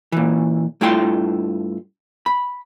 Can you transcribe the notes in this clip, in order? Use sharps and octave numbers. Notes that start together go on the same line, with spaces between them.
A#2 E3
G2 A3 E4 F4 G5 C6
B5